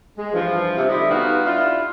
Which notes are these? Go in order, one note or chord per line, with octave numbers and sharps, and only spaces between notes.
G#3
G2 E3 F3
C3
D3 G3 D#4 E4
G3 B3 D#4 F4 F#4
D4 E4 F4